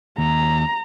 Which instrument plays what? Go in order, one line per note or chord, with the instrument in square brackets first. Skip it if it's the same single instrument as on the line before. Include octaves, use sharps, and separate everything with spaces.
[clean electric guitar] D#2 [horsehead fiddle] A#5